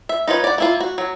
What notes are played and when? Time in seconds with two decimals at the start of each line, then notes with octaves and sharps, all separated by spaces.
0.09 E5
0.28 D#4 F4 B4 C#5
0.44 D5 F#5
0.58 A#3 E4 F4
0.80 F#4
0.98 F#3